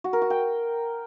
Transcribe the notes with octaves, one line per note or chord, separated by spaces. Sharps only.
F#4
A#4
F#4
G5